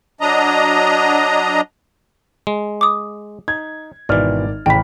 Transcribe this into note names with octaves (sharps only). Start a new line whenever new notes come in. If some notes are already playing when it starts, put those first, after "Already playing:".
F#3 D4 D#5 A#5
G#3
D6 D#6
D#4 G#6
G#1 B2 E3 D5 F6
A1 C#3 G5 B5 B6